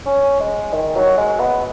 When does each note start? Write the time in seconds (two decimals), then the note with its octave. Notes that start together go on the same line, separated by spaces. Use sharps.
0.06 C#4
0.40 G#3
0.74 D#3
0.96 F#3
1.18 G#3
1.40 B3